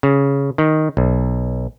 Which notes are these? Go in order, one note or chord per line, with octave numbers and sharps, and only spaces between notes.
C#3
D#3
B1